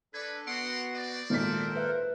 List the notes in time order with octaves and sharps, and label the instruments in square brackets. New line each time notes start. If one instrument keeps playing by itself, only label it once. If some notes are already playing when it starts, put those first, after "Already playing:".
[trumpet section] G#3 B4 [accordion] D4 A4 [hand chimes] G#6
[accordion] B3 F#4 [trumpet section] A#4 F#5 C6 [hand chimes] D7
[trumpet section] C4 D5
[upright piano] G#1 A#2 B6 [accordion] A4 A#4 C5
[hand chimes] B4 E5 F#6